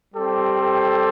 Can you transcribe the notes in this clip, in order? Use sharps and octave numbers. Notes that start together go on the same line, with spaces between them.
G3 C4 G4 A4
A4